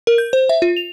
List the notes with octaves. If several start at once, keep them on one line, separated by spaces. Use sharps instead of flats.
A#4
G6
C5
E5
F4
F7